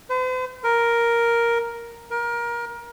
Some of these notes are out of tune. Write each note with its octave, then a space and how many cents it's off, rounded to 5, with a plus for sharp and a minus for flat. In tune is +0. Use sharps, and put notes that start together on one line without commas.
C5 -45
A#4 +5
A#4 +25